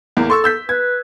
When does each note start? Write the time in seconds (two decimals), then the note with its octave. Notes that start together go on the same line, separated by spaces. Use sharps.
0.17 E2 A2 A#3
0.30 A4 C6 C#6 E6
0.44 E6 G6 B6
0.69 B4 G#6